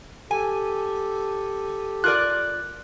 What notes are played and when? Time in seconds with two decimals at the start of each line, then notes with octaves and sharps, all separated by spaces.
0.31 G4 A4 G#5
2.04 F4 A#4 D5 F#6